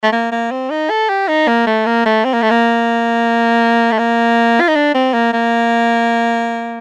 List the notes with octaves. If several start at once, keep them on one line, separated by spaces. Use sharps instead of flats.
A3
A#3
A#3
C4
D#4
A4
G4
D#4
A#3
A3
A#3
A3
C4
A#3
A3
A#3
A3
A#3
F4
D#4
D4
C4
A#3
A#3